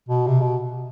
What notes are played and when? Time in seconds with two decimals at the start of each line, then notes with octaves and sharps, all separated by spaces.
0.08 B2
0.27 C3
0.41 B2